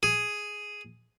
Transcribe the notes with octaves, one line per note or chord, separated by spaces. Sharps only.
G#4